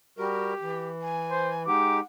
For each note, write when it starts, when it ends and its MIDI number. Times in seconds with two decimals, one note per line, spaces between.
0.18 0.53 55
0.18 0.53 66
0.18 0.88 67
0.18 0.53 70
0.62 1.66 52
1.01 1.63 80
1.32 1.53 72
1.67 2.00 56
1.67 2.00 63
1.67 2.00 67
1.67 1.98 78
1.67 2.01 86